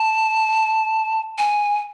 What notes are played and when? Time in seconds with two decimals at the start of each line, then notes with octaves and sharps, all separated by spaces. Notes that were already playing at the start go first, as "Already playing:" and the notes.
Already playing: A5
1.38 G#5